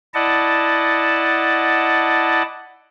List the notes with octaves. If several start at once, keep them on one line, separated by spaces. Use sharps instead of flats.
E4 D5 D#5 F#5 A5